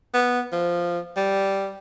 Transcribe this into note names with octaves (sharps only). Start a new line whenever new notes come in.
B3
F3
G3